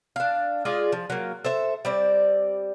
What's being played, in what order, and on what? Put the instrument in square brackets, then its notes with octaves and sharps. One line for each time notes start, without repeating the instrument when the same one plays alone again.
[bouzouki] D4 F5
G#3 F4 G#4 D5
F3
F#3 A#3
A4 C5 E5
G3 C4 D5